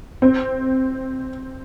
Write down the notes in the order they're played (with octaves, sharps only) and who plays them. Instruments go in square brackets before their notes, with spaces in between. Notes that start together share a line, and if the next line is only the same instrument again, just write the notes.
[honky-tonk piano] C4